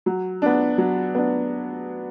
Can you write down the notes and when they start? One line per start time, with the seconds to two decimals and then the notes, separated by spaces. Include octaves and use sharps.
0.06 F#3
0.42 B3 D4
0.78 F#3
1.15 B3 D4